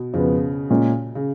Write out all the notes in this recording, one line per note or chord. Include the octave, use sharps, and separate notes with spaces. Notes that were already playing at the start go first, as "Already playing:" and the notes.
Already playing: B2
F2 C#3 F3 B3
A#2 G#3 C#4
C#3